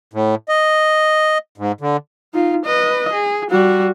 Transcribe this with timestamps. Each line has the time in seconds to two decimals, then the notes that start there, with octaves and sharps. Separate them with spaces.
0.13 A2
0.49 D#5
1.58 G#2
1.81 D3
2.34 D#4 F4
2.65 B4 D#5
3.13 G#4
3.50 G3 F#4